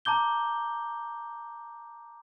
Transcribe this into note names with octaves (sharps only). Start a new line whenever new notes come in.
A5 A#5 D6 G6 G7